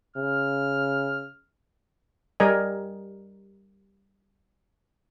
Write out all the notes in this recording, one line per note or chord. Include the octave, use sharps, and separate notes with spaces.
C#3 F6
G3 A#4 D5 D#5 G#5